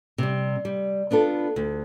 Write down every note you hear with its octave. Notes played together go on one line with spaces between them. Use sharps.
C3 G3
G3
B3 D4 F4 A4
D2